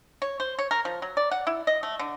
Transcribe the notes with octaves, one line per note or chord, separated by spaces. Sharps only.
C#5
C5
C#5
A#4
F3
F#3
D5
F#5
E4
D#5
A3
D3